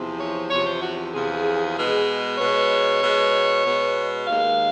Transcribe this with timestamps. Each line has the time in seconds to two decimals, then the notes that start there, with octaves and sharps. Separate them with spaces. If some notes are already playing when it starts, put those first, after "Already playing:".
Already playing: E2 C3 F3
0.19 C#5
0.50 E2 C3 F3 C#5
0.66 C5
0.81 F#4
1.13 E2 C3 F3 G#4
1.76 B2 G#3
2.38 B2 G#3 C#5
3.01 B2 G#3
3.64 B2 G#3
4.27 D#2 D#3 G#3 F5